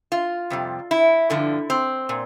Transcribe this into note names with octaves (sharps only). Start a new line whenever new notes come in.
F4
F2 C3 G3
E4
G2 D3 F3
C4
A#2